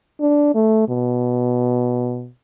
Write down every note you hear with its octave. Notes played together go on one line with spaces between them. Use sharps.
D4
A3
B2